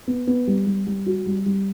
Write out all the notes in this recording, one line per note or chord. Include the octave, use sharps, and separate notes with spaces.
B3
B3
G3
G3
G3
F#4
G3
G3